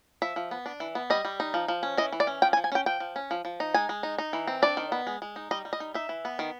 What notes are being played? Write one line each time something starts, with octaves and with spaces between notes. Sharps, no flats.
F3 E5
F3
B3
D4
E3
B3
G3 D#5
G3
D#4
F3
F3
C#4
E3 D#5
E3
D5
C#4
F3 G5
G#5
F3
G#5
C#4 G5
F3 G5
F3
C#4
F3
F3
D#4
G#3 G#5
G#3
D#4
D#4
E3
C4
D4 D5
D#3
B3
G#3
G#3
D#4
G3 D#5
G3
D#5
D#4
D#4 E5
E3
B3
D#3